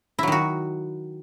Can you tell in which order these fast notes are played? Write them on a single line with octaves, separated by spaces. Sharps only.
E4 F#3 D#3 F#4